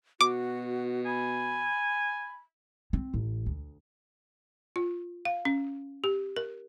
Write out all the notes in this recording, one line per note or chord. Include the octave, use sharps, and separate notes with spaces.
B2 F#4 D6
G#5 B5
C4
A1
D2
F4
F5
C#4
G4
A#4